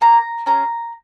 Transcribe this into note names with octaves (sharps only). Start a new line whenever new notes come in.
A#3 A#5
C#4 G#4 A#5